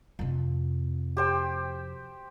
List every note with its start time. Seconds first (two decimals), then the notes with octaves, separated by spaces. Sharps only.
0.19 F2 C3
1.17 G4 C5 G5